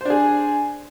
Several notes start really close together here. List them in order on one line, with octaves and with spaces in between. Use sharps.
C5 D4 G#4